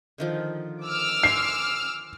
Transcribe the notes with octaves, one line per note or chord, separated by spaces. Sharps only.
D3 D#3 F3
D6 E6 F6
G#5 C6 C7